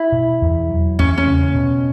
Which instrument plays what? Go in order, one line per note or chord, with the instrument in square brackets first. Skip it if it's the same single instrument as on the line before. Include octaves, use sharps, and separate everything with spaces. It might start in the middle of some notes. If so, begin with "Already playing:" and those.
Already playing: [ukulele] E4
[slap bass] B2
E2
F#3
[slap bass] E2 [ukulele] C#4
[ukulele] C#4
[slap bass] C#3
B2